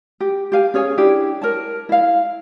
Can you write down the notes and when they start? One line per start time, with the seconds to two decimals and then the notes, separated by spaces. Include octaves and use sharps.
0.20 G4
0.52 G4 F5 G#5
0.74 C#4 G#4 C#5 G#5
0.98 D4 E4 G4
1.42 A#4 C#5 A5
1.89 E4 F5